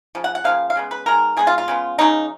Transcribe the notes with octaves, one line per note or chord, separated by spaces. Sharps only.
C#3 F3
F#5
F#5
C#3 F3 A#3 F5
F5
C#3 G#3 B3
B4
D#3 G#3 B3 A#4
B2 G#3 B3 G#4
F4
F4
C#3 G#3 B3
C#3 F#3 A#3 D#4